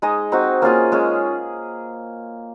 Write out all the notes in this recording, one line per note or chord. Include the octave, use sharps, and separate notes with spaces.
G#3 D#4 G#4 D#5
C4 D#4 F#4
A#3 C#4 F4 G#4
G#3 C#4 G#4